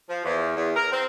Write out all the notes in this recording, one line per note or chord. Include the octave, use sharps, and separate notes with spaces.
F3
E2
E2
A#4
C4